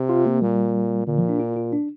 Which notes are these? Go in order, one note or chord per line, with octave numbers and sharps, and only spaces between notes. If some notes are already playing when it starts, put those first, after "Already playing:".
Already playing: C3
F4
A#3
A#2 G3
A#2 D3
F3
D4
F4
F4
D4